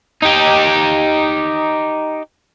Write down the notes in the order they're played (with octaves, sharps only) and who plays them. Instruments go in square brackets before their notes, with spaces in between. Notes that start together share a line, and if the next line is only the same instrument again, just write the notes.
[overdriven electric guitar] D#4 G4